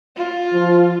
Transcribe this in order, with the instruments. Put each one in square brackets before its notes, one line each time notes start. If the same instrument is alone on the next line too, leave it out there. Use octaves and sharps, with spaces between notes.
[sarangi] F4
[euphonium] F3